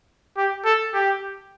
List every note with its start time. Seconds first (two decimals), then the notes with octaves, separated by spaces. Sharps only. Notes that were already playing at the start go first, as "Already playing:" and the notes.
0.37 G4
0.65 A4
0.94 G4